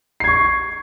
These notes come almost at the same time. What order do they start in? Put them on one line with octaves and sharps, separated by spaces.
C7 G#6 C#6